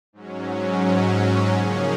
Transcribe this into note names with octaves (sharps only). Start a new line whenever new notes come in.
G#2 F#3 C#4
C#3 F3 A#3 C#4 G#4